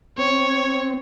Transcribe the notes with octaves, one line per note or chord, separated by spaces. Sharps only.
C4 C#5